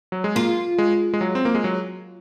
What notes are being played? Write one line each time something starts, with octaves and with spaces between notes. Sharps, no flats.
F#3
G#3
A#3 F4
G#3
G#3
F#3
C4
A#3
G#3
F#3